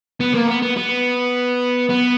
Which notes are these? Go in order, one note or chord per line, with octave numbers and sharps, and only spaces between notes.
B3
A#3
B3
B3
B3
B3